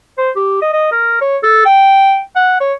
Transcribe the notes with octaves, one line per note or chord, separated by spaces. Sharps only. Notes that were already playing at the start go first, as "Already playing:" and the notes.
C5
G4
D#5
D#5
A#4
C#5
A4
G5
F#5
C#5